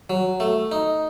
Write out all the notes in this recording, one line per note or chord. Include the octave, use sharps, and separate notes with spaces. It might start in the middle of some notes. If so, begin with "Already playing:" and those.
F#3
A3
D#4